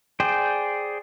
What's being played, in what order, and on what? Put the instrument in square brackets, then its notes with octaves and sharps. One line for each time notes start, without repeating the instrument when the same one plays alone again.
[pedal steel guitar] G#4 C5 D5 G5